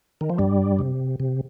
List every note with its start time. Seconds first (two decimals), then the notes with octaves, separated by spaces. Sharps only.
0.21 D#3
0.30 F3
0.38 G2 G3
0.79 C3
1.20 C3